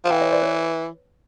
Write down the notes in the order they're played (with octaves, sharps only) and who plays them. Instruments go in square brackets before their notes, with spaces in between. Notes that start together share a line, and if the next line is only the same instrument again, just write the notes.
[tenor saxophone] F3
[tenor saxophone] E3 [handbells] F5 G5
[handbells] C#5 D#5
C5 D5
B4 C#5